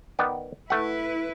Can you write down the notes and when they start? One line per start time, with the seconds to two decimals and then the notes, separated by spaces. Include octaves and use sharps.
0.19 D#3 B3 D5
0.70 A3 E4 B4 F#5